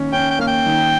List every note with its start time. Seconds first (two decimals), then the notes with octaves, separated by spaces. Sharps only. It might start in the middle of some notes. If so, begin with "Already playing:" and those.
Already playing: D#3 A#3 C#4
0.12 C#4 G5
0.30 G5
0.39 A#3 F5
0.48 G5
0.66 D#3